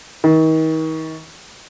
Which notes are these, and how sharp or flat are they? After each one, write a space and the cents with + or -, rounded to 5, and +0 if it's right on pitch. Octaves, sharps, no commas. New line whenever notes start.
D#3 +40